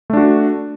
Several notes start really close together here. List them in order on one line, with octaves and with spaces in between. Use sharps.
A3 D4 F#4